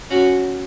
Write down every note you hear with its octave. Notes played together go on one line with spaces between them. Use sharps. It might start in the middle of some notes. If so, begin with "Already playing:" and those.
C#4 F#4